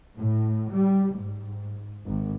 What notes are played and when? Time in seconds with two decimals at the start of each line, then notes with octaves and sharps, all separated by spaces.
0.16 A2
0.72 G3
1.16 G#2
2.05 G#1